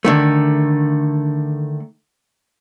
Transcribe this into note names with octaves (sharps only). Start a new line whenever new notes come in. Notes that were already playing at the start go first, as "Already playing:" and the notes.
D3 D#3 A3